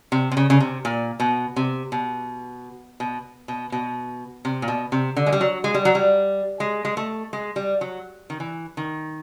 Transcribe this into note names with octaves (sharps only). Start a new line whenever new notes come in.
C3
C3
C#3
C#3
C3
A#2
B2
C3
B2
B2
B2
B2
C3
A#2
B2
C3
D3
G#3
G3
F#3
G#3
G3
F#3
G3
G#3
G#3
A3
G#3
G3
F#3
D#3
E3
D#3